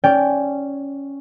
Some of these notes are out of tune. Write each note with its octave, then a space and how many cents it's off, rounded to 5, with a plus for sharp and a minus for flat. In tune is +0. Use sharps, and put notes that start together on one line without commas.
C#4 +0 D5 -15 G5 +0